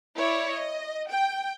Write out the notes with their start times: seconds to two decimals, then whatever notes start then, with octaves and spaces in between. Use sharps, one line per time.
0.16 E4 C#5 D5
0.51 D#5
1.10 G5